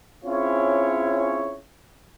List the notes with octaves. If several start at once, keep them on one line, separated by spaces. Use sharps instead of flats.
C4 C#4 E4 F4 G#4 C#5